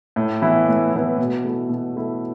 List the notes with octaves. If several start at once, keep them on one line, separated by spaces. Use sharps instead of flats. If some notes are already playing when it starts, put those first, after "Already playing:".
A2
E3 B3 E4
A2
E3 B3 E4
B2
A3 E4
B2
A3 E4